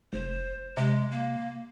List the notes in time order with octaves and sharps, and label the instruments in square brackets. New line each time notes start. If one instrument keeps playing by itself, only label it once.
[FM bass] F1 [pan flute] C5
[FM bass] C3 [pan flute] G#3
[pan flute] A#3